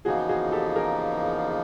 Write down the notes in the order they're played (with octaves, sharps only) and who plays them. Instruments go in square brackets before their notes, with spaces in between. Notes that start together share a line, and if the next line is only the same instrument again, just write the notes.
[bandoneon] E2 C#3 F3 A#3 D#4 [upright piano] F#4 G#4
[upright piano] F#4 G#4
G4 A4
G#4 A#4